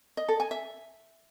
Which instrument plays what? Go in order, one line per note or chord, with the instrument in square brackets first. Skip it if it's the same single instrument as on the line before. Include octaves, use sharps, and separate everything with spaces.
[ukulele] D#5
A4
G#5
E5